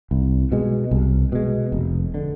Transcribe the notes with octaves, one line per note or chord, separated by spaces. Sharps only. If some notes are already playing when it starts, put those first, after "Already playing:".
C2
B2 G#3
C2
B2 G#3
F1
D3